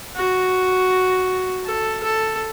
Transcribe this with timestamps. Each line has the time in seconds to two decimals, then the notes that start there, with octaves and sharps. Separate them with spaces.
0.16 F#4
1.65 A4
2.04 A4